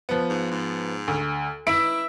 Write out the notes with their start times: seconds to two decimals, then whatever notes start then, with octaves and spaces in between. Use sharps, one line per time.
0.09 F3 B3
0.30 G#2
0.51 G#2
1.08 D2
1.67 E4 E5 D7